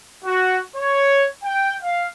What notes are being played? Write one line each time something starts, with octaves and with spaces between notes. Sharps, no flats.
F#4
C#5
G5
F5